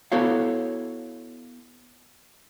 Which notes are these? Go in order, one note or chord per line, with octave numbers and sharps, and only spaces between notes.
B3 E4 F#4 A4 C#5 F5